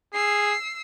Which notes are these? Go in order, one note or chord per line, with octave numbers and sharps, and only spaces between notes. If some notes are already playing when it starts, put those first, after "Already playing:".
G#4 E6 C7